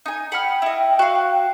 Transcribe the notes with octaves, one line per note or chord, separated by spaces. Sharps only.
D#4 G#5
F#5 G5 B5 F6
E4 D#5
F#4 F5